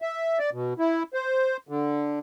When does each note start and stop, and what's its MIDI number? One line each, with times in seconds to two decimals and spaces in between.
0.02 0.39 76
0.39 0.50 74
0.53 0.73 47
0.79 1.03 64
1.14 1.57 72
1.69 2.19 50